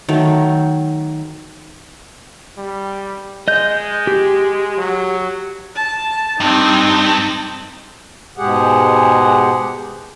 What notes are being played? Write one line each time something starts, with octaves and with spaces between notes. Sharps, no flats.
D#3 F#3 A3
G3
G#3 D#5 G6
G4
F#3
A5
G2 C4 D#4
G#2 B2 G#3 G4 G#4 F#5